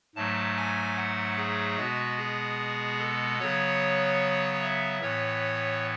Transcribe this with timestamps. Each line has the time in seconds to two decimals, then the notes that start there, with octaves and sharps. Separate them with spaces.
0.16 G#2 F#3 A3 A5
0.56 G#5
0.97 F#5
1.37 G#4
1.77 B2 G#3 B3 F#4
2.17 G#4
2.99 A4
3.39 C#3 F#3 B3 C#5
4.61 E5
5.01 A2 E3 B3 C#5